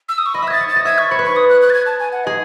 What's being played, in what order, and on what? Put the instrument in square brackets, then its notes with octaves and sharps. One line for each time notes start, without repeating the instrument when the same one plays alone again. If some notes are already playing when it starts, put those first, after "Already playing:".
[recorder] E6
D#6
C#6
[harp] D#5 [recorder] B5
[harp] E5
[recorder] G#6
[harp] D#5 [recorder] A6
[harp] C#5
[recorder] A6
[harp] D#5
[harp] E5 [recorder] G#6
[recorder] C#6
[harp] C#5 [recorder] B5
[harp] B4
[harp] C#5 [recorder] C#6
[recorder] D#6
F#6
F#6
A6
G#6
A5
G#5
F#5
[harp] G#4 [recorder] D#5